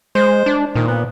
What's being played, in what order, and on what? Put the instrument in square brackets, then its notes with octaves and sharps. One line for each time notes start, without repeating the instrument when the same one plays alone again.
[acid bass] G#3 [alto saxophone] C5
[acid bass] D4
[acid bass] A#2 [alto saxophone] D#3
[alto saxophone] B3